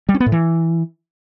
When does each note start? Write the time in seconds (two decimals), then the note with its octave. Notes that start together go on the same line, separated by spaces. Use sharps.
0.09 G3
0.14 C#4
0.20 B3
0.26 A2
0.32 E3